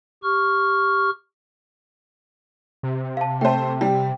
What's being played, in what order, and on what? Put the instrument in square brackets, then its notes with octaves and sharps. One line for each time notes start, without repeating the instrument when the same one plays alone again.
[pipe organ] G4 C#6 F6
[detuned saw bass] C3
[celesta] F5 A5
[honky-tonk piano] A3 C5 [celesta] G5 A5
[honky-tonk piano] G3 [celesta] G5